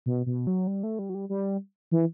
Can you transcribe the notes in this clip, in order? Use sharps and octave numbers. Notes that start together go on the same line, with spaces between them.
B2
B2
F#3
G3
A3
G3
F#3
G3
G3
E3